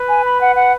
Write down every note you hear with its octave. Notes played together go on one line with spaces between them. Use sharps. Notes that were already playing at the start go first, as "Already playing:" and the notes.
Already playing: B4
G#5
B5
F#5
F#5